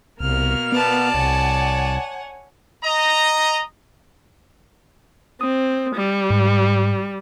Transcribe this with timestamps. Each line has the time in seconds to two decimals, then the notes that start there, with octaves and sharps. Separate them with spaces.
0.20 C2 B2 A#3 F6
0.72 B3 D5 A5
1.15 C2 C#5 F#5 G#5
2.83 D#5 A#5
5.41 C4 D#6
5.96 G3
6.30 G#2